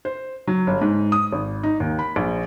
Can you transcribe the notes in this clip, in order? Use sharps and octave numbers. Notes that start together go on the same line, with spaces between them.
C5
F#3
G1
G#2
D#6
G#1
D#4
D#2
B5
A#1